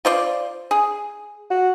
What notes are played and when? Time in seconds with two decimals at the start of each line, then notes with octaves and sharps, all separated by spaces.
0.05 F4 C5 D5
0.71 G#4
1.50 F#4